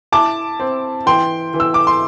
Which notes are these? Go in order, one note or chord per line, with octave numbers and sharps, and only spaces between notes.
E4 A5 D6
C4
E3 G5 C6
E3
E6
D6
C6